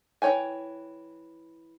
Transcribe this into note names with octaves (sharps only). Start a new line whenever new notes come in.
E3 F4 C#5 G5 G#5